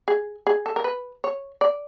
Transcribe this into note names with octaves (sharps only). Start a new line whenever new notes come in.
G#4
G#4
A4
A#4
B4
C#5
D5